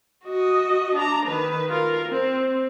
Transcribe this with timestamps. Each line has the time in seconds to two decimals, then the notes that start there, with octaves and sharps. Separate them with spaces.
0.25 F#4 D#5
0.95 D4 A#5
1.26 D#3 B4
1.70 F4 A#4
2.09 C4